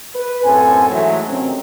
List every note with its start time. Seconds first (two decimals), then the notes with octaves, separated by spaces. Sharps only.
0.15 B4
0.44 F#2 A2 C4 A4 G#5
0.89 G#2 E3 F#3 A3
1.28 C3 D#3 F#3 C4 C#4